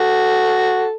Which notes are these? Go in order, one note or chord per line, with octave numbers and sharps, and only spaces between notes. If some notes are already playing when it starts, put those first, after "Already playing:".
Already playing: F#4 A4